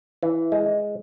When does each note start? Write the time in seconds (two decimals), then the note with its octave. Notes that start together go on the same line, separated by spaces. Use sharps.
0.23 E3
0.52 G#3